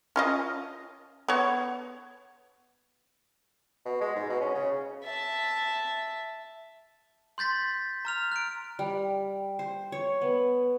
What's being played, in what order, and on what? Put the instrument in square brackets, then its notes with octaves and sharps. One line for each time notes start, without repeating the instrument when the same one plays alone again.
[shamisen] C#4 F4 D#5
B3 C#5
[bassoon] B2
G#3
G#2
B2
C#4
C#3
[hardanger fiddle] E5 A5
[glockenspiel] C6 G6 A6 B6
A#5 F6 F7
F#6 D7
[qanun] G3
C5
C#5
B3